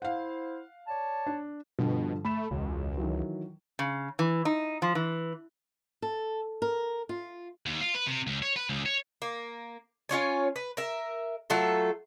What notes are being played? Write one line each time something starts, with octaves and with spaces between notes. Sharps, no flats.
E4 C5 F5 F#5
C#5 D5 A5
D4
G2 B2 D3 F3
A3 B5 E7
E1 C#2
D#3 E3 F#3
C#3
E3
D#4
F3
E3
A4
A#4
F4
D#2
F4
B4
C3
C#2
C#5
B4
C#2
C#5
A#3
C#4 F4 C#5 G#5
B4
A#4 E5
F#3 A3 F4 A4